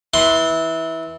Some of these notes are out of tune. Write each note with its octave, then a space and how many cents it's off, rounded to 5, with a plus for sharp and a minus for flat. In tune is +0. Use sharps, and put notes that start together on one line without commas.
E3 -20 C6 +0